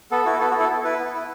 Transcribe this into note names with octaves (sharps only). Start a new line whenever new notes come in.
B3 A4
E4 F#4
B3 A4
F#4
E4 A4
B3
E4 B4
B3
E4